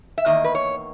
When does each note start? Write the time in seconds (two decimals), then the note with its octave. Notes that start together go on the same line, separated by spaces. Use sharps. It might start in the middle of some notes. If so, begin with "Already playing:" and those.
0.18 E5
0.25 E2 D#3 A#3 D#5
0.44 B4
0.55 C#5